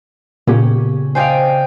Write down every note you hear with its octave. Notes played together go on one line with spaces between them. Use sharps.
A#2 C#3 B3 C#4 G4
C5 D5 D#5 F5 G5 G#5